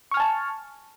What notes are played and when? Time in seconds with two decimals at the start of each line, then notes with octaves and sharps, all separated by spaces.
0.11 C#6
0.14 F6
0.17 G#5
0.20 A5